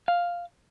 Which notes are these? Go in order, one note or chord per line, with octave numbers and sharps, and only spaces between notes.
F5